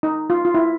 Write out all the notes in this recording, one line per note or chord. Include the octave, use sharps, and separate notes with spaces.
D#4
F4
F4
E4